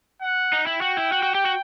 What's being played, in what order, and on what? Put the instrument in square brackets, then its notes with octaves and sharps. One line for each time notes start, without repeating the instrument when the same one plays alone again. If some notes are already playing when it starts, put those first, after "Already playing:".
[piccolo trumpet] F#5
[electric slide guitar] D#4
[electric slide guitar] E4 [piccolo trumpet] G5
[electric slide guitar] F#4
E4
F#4
F#4
G4
F#4